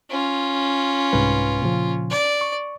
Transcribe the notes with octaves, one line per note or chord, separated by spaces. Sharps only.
C#4 F4
C2 G#2 B4
A#2 C#3 F3
D5
C#6